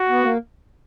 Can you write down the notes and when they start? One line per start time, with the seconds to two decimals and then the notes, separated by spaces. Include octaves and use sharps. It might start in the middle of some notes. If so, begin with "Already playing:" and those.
Already playing: F#4
0.09 B3
0.22 A#3